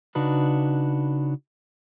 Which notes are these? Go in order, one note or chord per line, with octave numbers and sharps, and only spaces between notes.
C#3 D4 D#4 F#4 B4